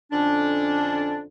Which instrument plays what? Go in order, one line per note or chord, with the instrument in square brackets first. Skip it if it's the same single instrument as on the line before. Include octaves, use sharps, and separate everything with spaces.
[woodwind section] F2 D3 C#4 D4